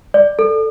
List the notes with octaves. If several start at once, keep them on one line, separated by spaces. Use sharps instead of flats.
D5
A4